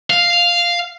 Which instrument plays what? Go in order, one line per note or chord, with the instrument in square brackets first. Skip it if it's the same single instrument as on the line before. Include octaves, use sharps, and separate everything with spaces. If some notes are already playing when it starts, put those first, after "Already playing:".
[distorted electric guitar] F5